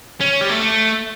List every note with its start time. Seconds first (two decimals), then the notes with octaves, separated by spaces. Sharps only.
0.20 C#4
0.41 G3
0.49 A3